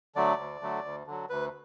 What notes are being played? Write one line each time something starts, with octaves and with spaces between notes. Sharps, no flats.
D3 F#3 A3 D5
D2
D3 F#3 A3
D2
D3 F#3
D2 B4